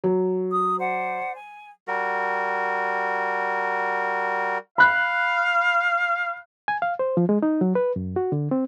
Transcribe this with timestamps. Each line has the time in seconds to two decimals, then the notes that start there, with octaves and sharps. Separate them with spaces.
0.04 F#3
0.51 D#6
0.78 C5 D5 F#5
1.36 G#5
1.88 G3 F#4 A#4
4.78 F5 B5 F#6
6.68 G#5
6.82 F5
6.99 C5
7.17 F3
7.29 G#3
7.43 D#4
7.61 F#3
7.75 B4
7.96 F#2
8.16 F#4
8.32 D3
8.51 C4